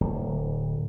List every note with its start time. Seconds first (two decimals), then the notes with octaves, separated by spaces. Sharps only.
0.01 D1